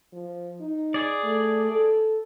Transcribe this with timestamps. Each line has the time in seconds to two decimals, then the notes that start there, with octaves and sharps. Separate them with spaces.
0.13 F3
0.61 D#4
0.94 G#4 D5
1.24 A3
1.71 A4